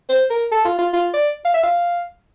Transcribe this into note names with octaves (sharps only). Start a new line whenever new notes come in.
C5
A#4
A4
F4
F4
F4
D5
F5
E5
F5